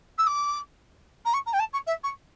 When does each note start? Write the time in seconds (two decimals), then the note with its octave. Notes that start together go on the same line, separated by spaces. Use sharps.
0.18 E6
0.27 D6
1.25 A#5
1.34 C#6
1.46 A#5
1.53 G5
1.59 A5
1.73 C#6
1.87 E5
2.03 C#6